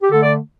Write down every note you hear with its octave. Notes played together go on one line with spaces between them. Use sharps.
G4
D3 A3 A4
D5